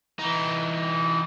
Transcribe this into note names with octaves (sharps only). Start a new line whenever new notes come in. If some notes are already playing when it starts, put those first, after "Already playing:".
E3 D#4